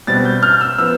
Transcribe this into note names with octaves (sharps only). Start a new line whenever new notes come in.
B2 G3 C4 A6
G6
F6
E6
F3 B3 E6